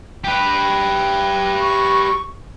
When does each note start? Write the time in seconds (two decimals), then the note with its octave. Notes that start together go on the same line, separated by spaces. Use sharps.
0.24 G4 B4
1.61 C#6